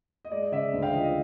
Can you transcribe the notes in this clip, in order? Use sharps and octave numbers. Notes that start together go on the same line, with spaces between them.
D#5
G#3 D5
D#5
C#3 D5 E5
D2
F5 G5
F3 D#5
D#5